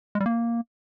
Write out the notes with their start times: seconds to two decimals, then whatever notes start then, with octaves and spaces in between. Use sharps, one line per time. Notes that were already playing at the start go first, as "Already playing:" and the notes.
0.15 G#3
0.20 G3
0.26 A#3